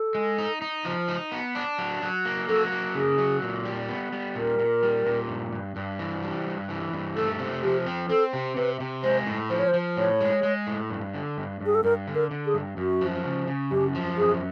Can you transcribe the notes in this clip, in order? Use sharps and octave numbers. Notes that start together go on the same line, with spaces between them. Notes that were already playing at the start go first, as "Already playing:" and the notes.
Already playing: A4
G#3
D#4
D#4
F3
D#4
B3
D4
F#3
F#3
A#3
F#3 A4
A#3
C#3 G#4
F#3
A#2
G3
B3
G3
A#2 A#4
A#2
G3
A#2
G2
G2
G2
E3
G3
G2
E3
G2
A3 A4
C3
F3 G4
C4
C4 A4
C3
C3 B4
C3
G#3 C5
A2
F3 C5
C#5
C5
F3
A2 C#5
G#3
G#3
A2
G2
D3
G2
G2
G#4
A4
G2 A#4
D3
A#4
D3
G#4
G2
F#2 F#4
F3
C#3
C#3
F#2 G4
F3
F#2 G#4